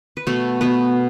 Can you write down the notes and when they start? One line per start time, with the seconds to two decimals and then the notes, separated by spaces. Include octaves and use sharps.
0.17 B4
0.27 B2 A3 A4
0.61 B2 B3 B4